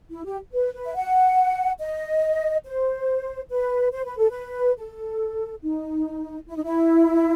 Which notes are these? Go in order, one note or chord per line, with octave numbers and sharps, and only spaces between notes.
E4
G4
B4
B4
E5
F#5
D#5
C5
B4
C5
B4
A4
B4
A4
D#4
E4
D#4
E4